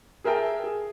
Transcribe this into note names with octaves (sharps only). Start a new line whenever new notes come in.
G#4 A#4 E5 G5 A5
G#4